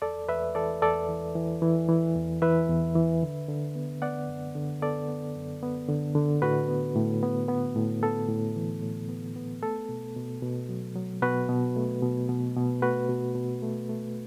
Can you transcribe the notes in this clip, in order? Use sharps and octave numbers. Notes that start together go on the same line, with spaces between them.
E2 A4 D5
E2 B4 E5
E3 A4 D5
E2 A4 D5
E3
E3
E3
E3
E2
E3 B4 E5
E2
E3
D3
D3
B3
B3 D5 F#5
F#2
D3
B3 A4 D5
B3
F#2
B3
D3
D3
A2 F#4 B4
B3
A2
B3
B3
A2
B3 A4
A2
E3
A2
B3
B3
A3 A4
B2
B2
B2
F#3
F#3
B2 F#4 B4
B2
A3
B2
B2
B2
A3 F#4 B4
B2
B2
A3
A3